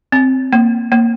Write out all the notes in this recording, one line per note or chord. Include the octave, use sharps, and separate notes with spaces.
C4
A#3
A#3